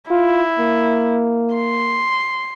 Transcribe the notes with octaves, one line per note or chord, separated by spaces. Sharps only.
E4 F4
A#3
C6